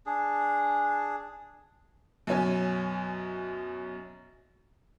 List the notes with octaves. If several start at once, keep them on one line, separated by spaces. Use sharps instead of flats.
D4 G#4
F#2 B2 C#4 G#5